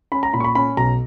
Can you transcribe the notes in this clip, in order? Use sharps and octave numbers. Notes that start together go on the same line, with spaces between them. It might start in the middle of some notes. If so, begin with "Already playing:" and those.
C#4 B5
A#5
A#2 B5
C#6
B5
C#4 B5
B1 A#5